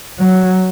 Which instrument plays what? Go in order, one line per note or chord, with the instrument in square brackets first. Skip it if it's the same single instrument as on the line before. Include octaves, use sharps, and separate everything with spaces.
[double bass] F#3